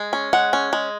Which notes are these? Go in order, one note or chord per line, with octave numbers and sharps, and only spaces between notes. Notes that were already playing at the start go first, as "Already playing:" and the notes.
Already playing: G#3
C#4
G#3 F#5
C#4
G#3